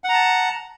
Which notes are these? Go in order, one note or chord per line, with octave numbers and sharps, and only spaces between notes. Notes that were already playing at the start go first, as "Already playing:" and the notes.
F#5 A5 A#5